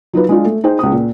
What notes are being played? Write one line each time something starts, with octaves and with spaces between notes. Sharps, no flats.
F#3 D#4 F4 B4
G#3 D4 F4
A3
D#4 G#4 C5 G5
C#2 D#6
A#2